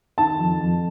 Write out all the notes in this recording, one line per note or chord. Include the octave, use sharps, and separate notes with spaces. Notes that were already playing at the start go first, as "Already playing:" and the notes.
D#3 A5
F2
F2